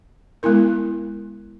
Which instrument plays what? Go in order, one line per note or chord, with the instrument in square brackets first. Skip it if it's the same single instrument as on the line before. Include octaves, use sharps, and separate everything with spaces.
[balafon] G#3 B3 E4 A#4